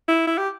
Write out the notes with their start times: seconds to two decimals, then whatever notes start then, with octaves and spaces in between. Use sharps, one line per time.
0.08 E4
0.27 E4
0.38 G4